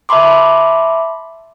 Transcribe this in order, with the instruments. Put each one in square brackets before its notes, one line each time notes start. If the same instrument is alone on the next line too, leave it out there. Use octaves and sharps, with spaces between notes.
[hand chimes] E5 A5 B5 C6 D6